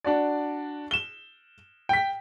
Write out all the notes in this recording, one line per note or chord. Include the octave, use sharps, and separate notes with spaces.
D4 F#4 D5
E7 G7
G5 B6